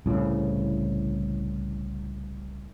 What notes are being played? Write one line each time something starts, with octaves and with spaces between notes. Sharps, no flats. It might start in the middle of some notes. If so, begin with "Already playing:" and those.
C2 A2 C#3